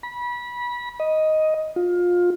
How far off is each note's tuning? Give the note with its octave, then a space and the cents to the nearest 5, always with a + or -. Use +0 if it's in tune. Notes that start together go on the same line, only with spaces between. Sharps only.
B5 -25
D#5 +5
F4 +20